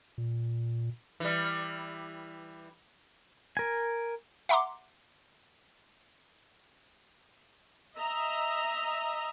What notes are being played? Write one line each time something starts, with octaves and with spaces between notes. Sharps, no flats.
A#2
E3 G3
A#4 G#5
E5 F#5 A#5 C6 D6
D#5 E5 A#5